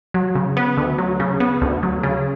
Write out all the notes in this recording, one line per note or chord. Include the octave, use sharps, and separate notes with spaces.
F#3
C#3
B3
D2
F#3
C#3
B3
D2
F#3
C#3